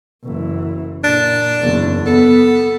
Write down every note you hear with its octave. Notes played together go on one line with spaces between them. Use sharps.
F#1 E3
A#2 D4
F#1 E2
B3 A4